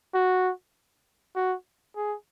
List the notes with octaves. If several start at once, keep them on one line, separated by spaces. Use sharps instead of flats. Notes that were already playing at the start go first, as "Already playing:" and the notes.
F#4
F#4
G#4